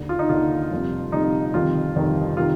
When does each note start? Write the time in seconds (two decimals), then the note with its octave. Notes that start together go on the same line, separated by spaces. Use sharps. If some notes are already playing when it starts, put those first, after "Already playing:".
Already playing: D#2 D3
0.09 F4
0.19 D#4
0.29 D#2 D3 F4
0.71 G1 F2 C3
1.12 G1 F2 C3 D#4
1.54 G1 F2 C3 D#3 F4
1.96 G1 F2 C3 D#3
2.37 C3 D#3 F4